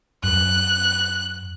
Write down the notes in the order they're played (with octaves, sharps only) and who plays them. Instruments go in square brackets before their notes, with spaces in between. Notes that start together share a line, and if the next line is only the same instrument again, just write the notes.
[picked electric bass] F#2 [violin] F#6